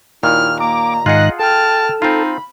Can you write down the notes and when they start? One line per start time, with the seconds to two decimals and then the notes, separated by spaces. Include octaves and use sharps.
0.23 D#2 A#2 D#3 E4 F6
0.60 A#3 A#5 D6
1.06 G#2 D#3 F4 G#4 D#5 F#5 F#6
1.39 A4 G5 A5 F6
2.02 C4 D#4 F4 B5